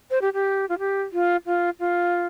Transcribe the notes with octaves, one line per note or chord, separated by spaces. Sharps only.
C5
G4
G4
F4
G4
F4
F4
F4